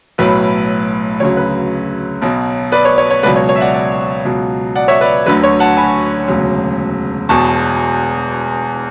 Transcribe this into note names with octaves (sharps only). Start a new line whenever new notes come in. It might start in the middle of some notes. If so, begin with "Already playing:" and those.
B1 A2 F#3 B4
D2 C#3 F#3 C#5
B4
B1 B2 F#3
B4 D5
C#5
C#5
C#5
C#2 B2 F#3 B4 D5
C#5
C#5
E5
D5 F#5
D5 F#5
C#2 B2 F#3
D5 F#5
C#5 E5
B4 D5
D2 D3 F#3 B4
C#5
F#5 A5
G#5 B5
E1 D2 C#3 F#3
E1 E2 B2 A5 C#6